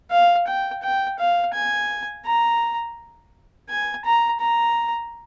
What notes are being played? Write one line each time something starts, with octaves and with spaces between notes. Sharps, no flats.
F5
G5
G5
F5
G#5
A#5
G#5
A#5
A#5